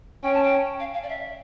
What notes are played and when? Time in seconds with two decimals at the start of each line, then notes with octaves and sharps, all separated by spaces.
0.24 C#4 G5
0.34 A5
0.43 G5
0.80 F5
0.94 F5
1.03 D5
1.09 E5